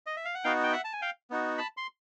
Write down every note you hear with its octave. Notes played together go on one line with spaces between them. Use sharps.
D#5
E5
F5
F#5
B3 D#4 F#4 F5 G5
G5
E5 F#5
A5
G#5
F5 G5
B3 D#4 F#4
A5 B5
C6